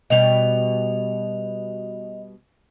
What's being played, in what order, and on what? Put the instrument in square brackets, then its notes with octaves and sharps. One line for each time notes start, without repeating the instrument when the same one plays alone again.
[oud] B2 G3 [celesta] D#5 F7